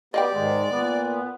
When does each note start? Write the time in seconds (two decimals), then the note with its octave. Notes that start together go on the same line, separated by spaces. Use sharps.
0.14 B3 G4 D5 D#5 F5 G5
0.34 G#2 D#3 G#3
0.71 A#2 B3